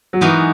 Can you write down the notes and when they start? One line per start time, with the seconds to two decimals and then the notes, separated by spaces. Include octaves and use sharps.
0.13 F#3
0.21 E3 G#3 B3 D#4 F#4 A#4